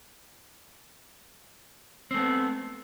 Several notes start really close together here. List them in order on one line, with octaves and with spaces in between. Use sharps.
C4 A3 B3